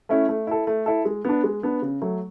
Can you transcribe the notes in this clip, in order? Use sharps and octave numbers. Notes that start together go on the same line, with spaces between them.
A3 C#4 E4
A3
E4 A4
A3
E4 A4
G#3
B3 D4
G#3
B3 D4
C#3
F#3 A3